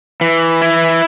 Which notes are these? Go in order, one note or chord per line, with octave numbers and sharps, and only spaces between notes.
E3
E4